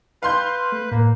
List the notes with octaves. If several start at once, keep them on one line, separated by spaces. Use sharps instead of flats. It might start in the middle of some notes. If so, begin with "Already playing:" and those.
B4 F5 C6 G6
A3
A2 A#3